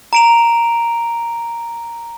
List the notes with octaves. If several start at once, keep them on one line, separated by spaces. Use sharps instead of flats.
A#5 D7 F7